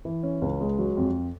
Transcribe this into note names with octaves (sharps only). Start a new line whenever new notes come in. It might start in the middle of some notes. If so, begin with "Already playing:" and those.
E3
C#4
C#2
G#3
F#3
F2